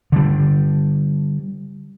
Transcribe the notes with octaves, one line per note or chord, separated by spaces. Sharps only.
D3 G3